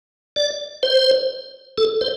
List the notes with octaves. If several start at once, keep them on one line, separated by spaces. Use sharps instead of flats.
D5
C5
A4
C5